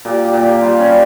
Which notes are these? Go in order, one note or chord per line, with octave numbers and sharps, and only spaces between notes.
A#2 G4
G4
A#2
G4
G3 F4
C#4
G3